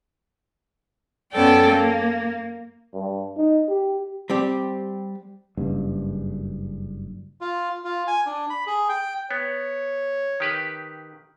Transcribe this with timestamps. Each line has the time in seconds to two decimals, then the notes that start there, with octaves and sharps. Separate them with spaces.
1.33 F#2 B3 C#4 A4 D5 G5
1.66 A#3
2.94 G2
3.37 D#4
3.69 G4
4.30 G3 C4 G4
5.57 F#1 G2
7.41 F4
7.84 F4
8.07 G#5
8.26 D4
8.50 B5
8.67 G#4
8.89 G5
9.31 B3 C#5
10.40 D#3 G4 B4